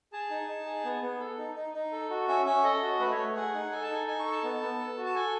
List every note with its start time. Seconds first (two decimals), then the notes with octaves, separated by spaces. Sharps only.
0.13 G#4 A5
0.30 D#4
0.48 D#4
0.66 G#4
0.84 B3
1.02 B3
1.20 A4
1.38 D#4
1.55 D#4
1.74 D#4
1.92 A4
2.10 F#4
2.28 C#4 E5
2.45 C#4 E5
2.64 A4 D#5
2.81 F#4
3.00 A3 B4
3.12 C#5
3.17 A3
3.36 G#4 F#5
3.54 D#4
3.71 A4 G#5
3.83 A5
3.90 D#4 G#5
4.07 D#4 G#5
4.19 C#6
4.25 A4
4.31 A5
4.43 B3
4.61 B3
4.79 A4
4.97 F#4
5.05 A5
5.15 A4 G#5